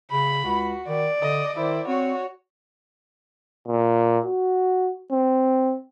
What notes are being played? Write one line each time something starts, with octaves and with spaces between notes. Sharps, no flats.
C#3 B5
C#2 F#4
D#3 D5
D3 D#5
D#3 E4 C5
C4 F#4 C#5
A#2
F#4
C4